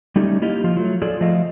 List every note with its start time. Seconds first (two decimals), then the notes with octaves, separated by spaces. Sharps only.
0.16 G3 A3 C#4 D#4 G4
0.42 A#3 E4 F4 G4 D#5
0.64 F3 F4
0.77 F#3 A3
1.02 F4 G#4 A4 D5
1.21 F3 A3 D#5 F5